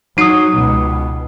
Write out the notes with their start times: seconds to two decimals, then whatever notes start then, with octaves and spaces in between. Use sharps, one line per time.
0.18 F#3 D#4 D#6 C7
0.55 C#2 B2